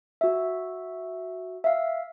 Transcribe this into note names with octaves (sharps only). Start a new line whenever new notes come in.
F#4 E5
E5 F5